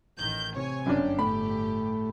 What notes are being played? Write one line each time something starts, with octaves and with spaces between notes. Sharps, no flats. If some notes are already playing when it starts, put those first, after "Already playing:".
A1 D#3 G6
C3 C#5 G#5
G1 F#2 C#4 D4 G4
A2 A3 B5